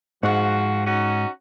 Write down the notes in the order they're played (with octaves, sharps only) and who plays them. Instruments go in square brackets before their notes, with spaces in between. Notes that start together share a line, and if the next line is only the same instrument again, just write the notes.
[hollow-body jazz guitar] G#2 [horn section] F3 F#4
[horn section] C#4 D#4 F#4